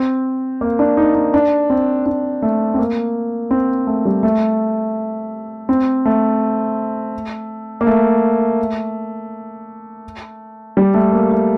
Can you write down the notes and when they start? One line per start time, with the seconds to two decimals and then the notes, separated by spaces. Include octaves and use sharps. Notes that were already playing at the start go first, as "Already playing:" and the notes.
Already playing: C4
0.61 A#3
0.79 D4
0.97 D#4
1.15 D#4
1.34 D4
1.70 C4
2.06 D4
2.42 A3
2.74 C4
2.79 A#3
3.51 C4
3.87 A3
4.05 G3
4.23 A3
5.69 C4
6.05 A3
7.81 A#3
7.87 A3
10.77 G3
10.94 A3
11.12 A#3
11.31 A3